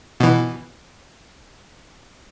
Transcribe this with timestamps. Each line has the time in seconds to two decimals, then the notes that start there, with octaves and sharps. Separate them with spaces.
0.20 B2 E3